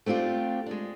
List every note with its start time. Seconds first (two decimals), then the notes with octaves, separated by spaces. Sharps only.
0.06 A3 C4 D4 F4 G4
0.66 G#3 D4